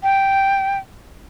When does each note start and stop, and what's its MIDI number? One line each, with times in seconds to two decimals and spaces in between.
0.03 0.78 79